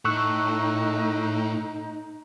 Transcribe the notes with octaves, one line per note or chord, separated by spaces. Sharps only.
A2 D#4 C#6 E6 F#6